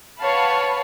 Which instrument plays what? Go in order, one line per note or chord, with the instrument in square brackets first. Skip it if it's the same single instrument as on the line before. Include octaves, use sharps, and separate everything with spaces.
[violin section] B4 C#5 F5 F#5 A5 B5